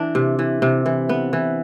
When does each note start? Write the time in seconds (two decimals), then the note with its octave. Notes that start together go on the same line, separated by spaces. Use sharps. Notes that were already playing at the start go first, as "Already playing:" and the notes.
Already playing: E3 D4
0.15 C3
0.39 E3
0.62 C3
0.86 E3
1.09 B3
1.33 E3